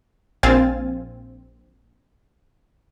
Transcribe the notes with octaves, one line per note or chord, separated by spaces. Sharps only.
A#1 C4 F5 G#5 A6